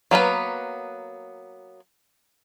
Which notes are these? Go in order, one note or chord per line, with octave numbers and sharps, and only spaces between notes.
F#3 A#3 B3 B4